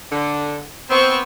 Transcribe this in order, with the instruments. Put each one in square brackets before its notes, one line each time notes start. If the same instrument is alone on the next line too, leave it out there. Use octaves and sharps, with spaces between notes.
[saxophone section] D3
[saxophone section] B3 C4 [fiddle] C5 C#6